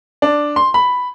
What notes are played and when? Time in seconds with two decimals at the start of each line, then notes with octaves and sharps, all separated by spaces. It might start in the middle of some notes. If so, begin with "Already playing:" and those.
0.22 D4
0.56 C6
0.74 B5